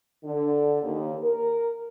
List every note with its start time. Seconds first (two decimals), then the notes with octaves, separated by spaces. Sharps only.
0.24 D3
0.83 D#2
1.21 A#4